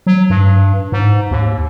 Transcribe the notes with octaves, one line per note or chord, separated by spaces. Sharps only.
F#3
G2
G#2
D#2